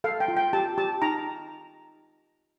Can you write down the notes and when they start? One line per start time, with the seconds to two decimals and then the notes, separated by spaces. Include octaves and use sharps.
0.04 A4 F5
0.20 G5
0.28 F4
0.37 G5
0.53 G4 A5
0.78 G4 A5
1.02 D#4 A#5